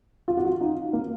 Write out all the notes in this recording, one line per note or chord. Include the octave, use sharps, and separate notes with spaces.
F4
F#4
F4
D#4
A#3